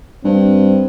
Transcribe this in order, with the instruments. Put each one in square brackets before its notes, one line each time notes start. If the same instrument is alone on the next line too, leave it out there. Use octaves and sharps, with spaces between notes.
[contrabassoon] G2 [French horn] C4